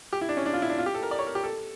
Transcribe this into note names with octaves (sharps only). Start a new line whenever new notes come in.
G4
E4
D4
C#4
D4
F4
E4
D4
F4
G4
A4
A#4
D5
C#5
A#4
G4
A4